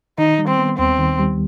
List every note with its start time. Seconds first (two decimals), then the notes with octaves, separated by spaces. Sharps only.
0.18 D#3 D#4
0.39 G3
0.48 C4
0.59 B3
0.78 D#2 C4
0.99 D#3
1.19 G3